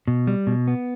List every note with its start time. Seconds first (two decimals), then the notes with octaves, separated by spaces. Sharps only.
0.07 B2
0.27 G3
0.47 B2
0.68 B3